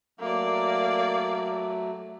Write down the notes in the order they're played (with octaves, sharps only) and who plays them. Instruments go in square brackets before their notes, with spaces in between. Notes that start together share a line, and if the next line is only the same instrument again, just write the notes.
[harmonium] F#3 A3 [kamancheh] A#3 D5